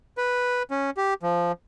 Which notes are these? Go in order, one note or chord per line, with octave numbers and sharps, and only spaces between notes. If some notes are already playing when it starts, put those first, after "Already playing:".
B4
C#4
G4
F3